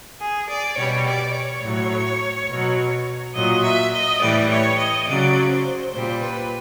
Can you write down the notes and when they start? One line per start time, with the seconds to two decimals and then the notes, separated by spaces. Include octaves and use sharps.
0.20 G#4
0.49 D5
0.77 B2 G3 C#5
1.06 D5
1.35 C#5
1.63 A2 F#3
2.50 B2 F#3
3.35 A#2 F#3 D#5
3.64 E5
3.93 D#5
4.21 A2 E3 G3 D5
4.50 C#5
4.78 D#5
5.07 C#3 F#3 D5
5.50 C5
5.93 A#2 G3 C5
6.22 B4